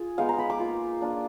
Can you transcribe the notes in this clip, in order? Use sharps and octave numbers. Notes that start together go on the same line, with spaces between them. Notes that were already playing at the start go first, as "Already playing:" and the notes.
Already playing: F4 G#4
G#3 B3 D#4 F5
A#5
B5
D6
A#3 F4
A#3 D4 F4